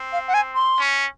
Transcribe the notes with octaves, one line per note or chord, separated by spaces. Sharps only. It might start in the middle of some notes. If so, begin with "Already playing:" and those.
Already playing: C4
F5
F#5
G#5
C6
C#4